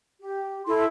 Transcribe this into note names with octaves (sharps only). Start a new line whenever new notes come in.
G4
E4 A4 C6